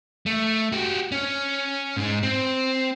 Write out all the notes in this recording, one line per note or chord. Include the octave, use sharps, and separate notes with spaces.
A3
F#4 G4
C#4
G#2 G#3
C4